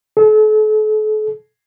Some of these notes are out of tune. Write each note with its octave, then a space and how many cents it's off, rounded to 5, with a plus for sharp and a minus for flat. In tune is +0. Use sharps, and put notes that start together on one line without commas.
A4 -40